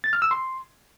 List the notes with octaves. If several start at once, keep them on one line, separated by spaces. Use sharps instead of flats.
A6
F6
E6
C6